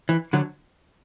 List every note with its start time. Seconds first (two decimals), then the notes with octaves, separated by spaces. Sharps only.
0.09 E3
0.33 D3 F#3